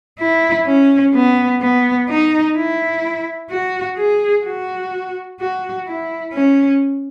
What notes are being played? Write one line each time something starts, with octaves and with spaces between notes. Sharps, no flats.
E4
C#4
B3
B3
D#4
E4
F#4
G#4
F#4
F#4
E4
C#4